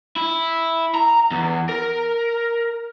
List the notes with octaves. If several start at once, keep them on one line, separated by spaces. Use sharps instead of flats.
E4
A#5
E2
A#4